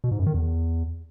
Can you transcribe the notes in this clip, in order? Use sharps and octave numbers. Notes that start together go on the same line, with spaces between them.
B2
G#2
F#2
D#3
E2